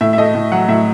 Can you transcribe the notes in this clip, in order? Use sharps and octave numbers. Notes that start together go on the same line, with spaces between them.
A2 E5
E5
A3 D#5
A2
F#3 F#5
A2 E5